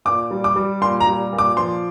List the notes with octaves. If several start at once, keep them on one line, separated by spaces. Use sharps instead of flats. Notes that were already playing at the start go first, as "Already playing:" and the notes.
A#2 D6
G3
D6
G3
A#2 C6
A#5
G3
A#2
D6
F3 C6